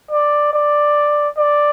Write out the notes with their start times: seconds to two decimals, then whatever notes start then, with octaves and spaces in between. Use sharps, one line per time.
0.11 D5
0.53 D5
1.38 D5